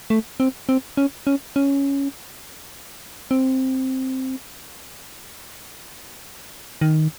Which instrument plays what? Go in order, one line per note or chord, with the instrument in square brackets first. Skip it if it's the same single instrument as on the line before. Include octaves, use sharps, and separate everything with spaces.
[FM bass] A3
C4
C4
C#4
C#4
C#4
C4
D#3